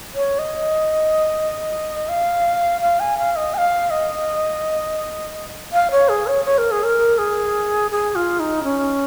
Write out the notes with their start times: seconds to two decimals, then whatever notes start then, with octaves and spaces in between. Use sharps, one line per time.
0.15 C#5
0.39 D#5
2.09 F5
2.81 F5
3.00 G#5
3.18 F5
3.36 D#5
3.54 G#5
3.58 F5
3.90 D#5
5.73 F5
5.91 C#5
6.09 G#4
6.27 C#5
6.45 C#5
6.58 A#4
6.71 G#4
6.83 A#4
7.18 G#4
7.91 G#4
8.15 F4
8.39 D#4
8.64 C#4